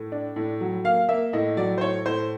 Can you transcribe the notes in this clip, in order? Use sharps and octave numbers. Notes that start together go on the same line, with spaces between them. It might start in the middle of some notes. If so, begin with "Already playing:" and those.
Already playing: A2
D4
A2
F#3
A#3 F5
A#3 E5
A2 D#5
F#3 D5
C5
A2 C#5
A2 C5